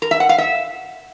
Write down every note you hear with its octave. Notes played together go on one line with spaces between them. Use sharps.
A#4
E5
F#5
F5
E5